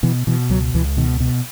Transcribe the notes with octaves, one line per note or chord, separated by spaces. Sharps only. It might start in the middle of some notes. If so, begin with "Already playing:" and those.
B2 E3
B2 E3
C#2 F#3
C#2 E3
B2 D#3
B2